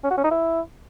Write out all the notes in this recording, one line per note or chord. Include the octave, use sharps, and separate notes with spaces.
C#4
F#4
C#4
D#4
E4